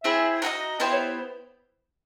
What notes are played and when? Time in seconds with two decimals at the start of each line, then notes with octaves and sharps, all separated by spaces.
0.04 C4 E4 G#4 E5
0.42 D#4 F#4 B4 D#5
0.80 B3 E4 G4 C5
0.92 C#5